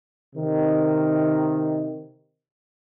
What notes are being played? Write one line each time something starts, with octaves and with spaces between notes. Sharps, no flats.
C3 D#3